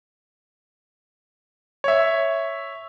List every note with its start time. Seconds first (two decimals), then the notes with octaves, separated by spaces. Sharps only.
1.84 C#5 E5